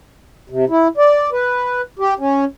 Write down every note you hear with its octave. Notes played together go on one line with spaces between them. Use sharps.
C3
E4
D5
B4
G4
C#4